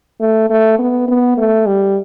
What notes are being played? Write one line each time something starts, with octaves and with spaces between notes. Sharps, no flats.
A3
A3
B3
B3
A3
G3